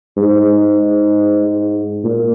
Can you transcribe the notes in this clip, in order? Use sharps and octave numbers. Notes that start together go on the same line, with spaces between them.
G#2
A#2